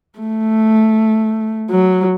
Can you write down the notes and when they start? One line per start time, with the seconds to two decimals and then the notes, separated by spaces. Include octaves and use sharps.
0.19 A3
1.70 F#3